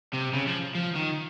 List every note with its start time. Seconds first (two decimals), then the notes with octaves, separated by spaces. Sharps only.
0.14 C3
0.34 C#3
0.47 F3
0.75 F3
0.95 D#3